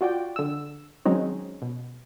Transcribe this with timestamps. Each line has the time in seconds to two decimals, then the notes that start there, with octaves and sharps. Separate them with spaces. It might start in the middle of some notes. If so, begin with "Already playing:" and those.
0.01 F4 F#4 D5 G5
0.36 D3 E6
1.05 D#3 F#3 G#3 C4 C#4 D#4
1.62 B2